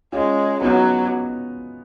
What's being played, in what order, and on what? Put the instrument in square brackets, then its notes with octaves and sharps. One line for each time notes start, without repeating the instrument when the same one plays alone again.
[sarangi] G#3 [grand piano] C#4 F4
[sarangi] F#3 [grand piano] B3 D#4